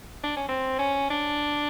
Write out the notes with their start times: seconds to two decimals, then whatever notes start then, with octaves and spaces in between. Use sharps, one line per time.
0.24 D4
0.36 C#4
0.48 C4
0.79 C#4
1.10 D4